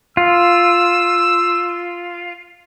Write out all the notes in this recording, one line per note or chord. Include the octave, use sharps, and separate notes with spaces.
F4 E6